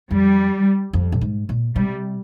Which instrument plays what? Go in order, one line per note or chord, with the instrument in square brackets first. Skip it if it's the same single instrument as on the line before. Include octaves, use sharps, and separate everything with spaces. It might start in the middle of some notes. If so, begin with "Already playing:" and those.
[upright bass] F2 [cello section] G3
[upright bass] F2
A#2
G#2
A#2
[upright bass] C3 [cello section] G3